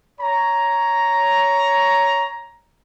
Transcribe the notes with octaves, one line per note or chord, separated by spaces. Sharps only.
C#5 A#5